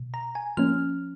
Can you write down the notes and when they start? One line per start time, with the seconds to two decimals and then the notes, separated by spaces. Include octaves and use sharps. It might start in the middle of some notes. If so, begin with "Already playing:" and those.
Already playing: B2
0.14 A#5
0.35 G#5
0.57 F3 A#3 C#4 F6